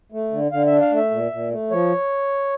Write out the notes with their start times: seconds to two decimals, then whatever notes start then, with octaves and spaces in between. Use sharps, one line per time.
0.12 A3
0.31 D3
0.52 D3 F5
0.67 E5
0.72 D4
0.81 F5
0.91 A3
0.97 E5
1.11 A#2
1.32 A#2
1.51 A3
1.71 F3 C#5